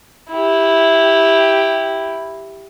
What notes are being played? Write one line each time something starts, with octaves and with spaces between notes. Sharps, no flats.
E4 G4